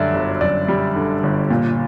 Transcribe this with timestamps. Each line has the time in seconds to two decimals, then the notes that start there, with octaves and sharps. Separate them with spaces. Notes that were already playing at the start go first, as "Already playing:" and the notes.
Already playing: F#2 D3 G3 D5 E5
0.14 G1
0.41 F#2 D5
0.68 G3
0.96 D3
1.23 G1
1.50 A#2